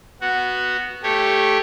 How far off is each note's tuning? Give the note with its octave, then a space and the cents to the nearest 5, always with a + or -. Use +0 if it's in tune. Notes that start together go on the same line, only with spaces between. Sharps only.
B3 -5 F#4 +0
A3 +0 G4 +0 C#5 -10